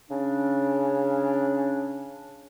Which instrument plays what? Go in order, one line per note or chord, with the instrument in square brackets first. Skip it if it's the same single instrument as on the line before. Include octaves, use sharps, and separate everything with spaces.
[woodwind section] C#3 C#4 D4